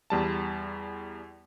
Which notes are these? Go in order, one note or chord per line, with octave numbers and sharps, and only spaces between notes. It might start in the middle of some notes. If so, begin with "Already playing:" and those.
E2 G3 A5